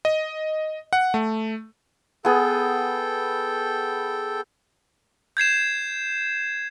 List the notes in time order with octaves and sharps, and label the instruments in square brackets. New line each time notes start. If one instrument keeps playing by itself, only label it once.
[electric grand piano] D#5
F#5
A3
[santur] B3 G#4 [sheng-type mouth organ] A4 G5
[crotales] G6 G#6 C7 E7